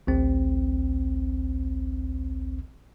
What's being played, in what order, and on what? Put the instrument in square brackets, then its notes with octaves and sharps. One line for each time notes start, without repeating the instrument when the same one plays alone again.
[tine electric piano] A1 D2 C4